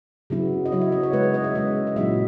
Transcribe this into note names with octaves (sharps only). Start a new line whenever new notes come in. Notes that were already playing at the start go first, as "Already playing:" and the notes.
C#3 F#3 B3 E4
D#5
C#3 F#3 B3 E4 C#5
E5
D#5
C#5
C#3 G#3 B3 B4
B4
D#5
E5
C#3 G#3 B3 D#5
D#5
A#2 F#3 C#4 E4 E5